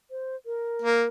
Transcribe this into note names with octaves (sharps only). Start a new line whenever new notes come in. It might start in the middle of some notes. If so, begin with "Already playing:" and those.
C5
A#4
A#3